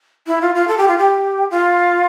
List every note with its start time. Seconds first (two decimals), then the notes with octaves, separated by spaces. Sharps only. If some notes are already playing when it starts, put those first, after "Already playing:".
0.27 E4
0.41 F4
0.55 F4
0.68 A4
0.78 G4
0.88 F4
0.98 G4
1.51 F4